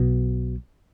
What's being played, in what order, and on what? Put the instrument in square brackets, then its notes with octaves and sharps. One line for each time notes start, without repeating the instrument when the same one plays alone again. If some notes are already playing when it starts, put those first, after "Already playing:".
Already playing: [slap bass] B1 B2